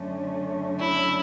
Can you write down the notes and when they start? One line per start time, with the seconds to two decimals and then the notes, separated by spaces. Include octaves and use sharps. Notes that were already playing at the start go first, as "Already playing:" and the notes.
Already playing: F#2 D3 A3 C#4
0.80 E4